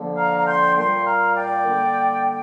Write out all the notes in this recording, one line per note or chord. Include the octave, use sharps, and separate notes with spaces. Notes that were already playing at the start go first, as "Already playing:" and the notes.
Already playing: D3 F3 A#3
F5 A#5
A#5
G5 C6
A#2 G3 A#3 G5 C6
F5 A#5
D5 G5
D3 G3 A#3